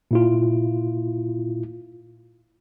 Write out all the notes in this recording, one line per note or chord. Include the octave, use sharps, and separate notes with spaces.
A#2 E4 F4